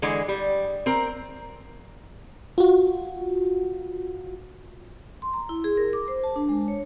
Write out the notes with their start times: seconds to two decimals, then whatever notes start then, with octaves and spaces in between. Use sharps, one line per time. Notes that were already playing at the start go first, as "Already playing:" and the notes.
0.02 D3 E3 G#3
0.28 G3
0.86 C4 A#4
2.58 F4 F#4
5.22 C6
5.34 A#5
5.49 E4
5.64 G#4
5.77 A#4
5.93 D6
6.08 C5
6.24 A5
6.36 D4
6.49 G#3
6.68 C#5